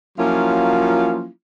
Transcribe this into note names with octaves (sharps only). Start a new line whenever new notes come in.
F3 F#3 A#3 C#4 E4 F4